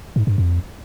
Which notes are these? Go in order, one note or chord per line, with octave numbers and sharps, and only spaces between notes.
G#2
G2
F2